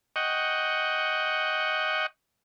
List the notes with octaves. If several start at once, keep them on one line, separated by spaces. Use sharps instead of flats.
D#5 F#5 G5 C#6